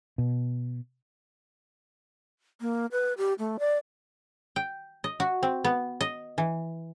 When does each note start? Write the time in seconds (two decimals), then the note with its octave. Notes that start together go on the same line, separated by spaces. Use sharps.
0.18 B2
2.61 A#3
2.92 B4
3.18 G4
3.39 A3
3.59 D5
4.56 G5
5.04 D#5
5.20 F#4
5.43 C4
5.64 B3
6.01 D#5
6.38 E3